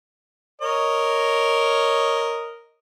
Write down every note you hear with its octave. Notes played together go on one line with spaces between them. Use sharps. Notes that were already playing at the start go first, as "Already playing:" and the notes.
A#4 C#5 D#5